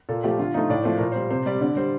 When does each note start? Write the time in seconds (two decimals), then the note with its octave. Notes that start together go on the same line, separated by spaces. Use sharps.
0.09 A#2 A4
0.24 F3 A3 G4
0.39 D3 F4
0.54 F3 A3 D#4
0.70 A2 D5
0.84 F3 A3 C5
0.97 A#2 A#4
1.12 G3 C5
1.30 C3 C5
1.46 G3 D5
1.61 D3 D5
1.76 G3 C5